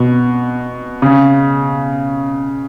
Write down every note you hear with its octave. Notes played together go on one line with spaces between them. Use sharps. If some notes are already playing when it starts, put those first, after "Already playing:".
Already playing: B2
C#3